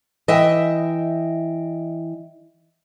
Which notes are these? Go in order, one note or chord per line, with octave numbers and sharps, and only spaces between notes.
E3 D#5 E5 G5